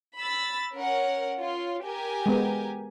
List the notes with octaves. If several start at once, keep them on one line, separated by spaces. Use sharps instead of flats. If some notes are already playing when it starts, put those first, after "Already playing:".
B5 E6 A6
C#4 A#4 F#5
F4 C#5
G4 A#4 G#5
G#3 B3